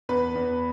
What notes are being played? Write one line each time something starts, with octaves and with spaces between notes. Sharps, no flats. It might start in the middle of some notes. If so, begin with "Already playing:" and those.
E2 B4
E2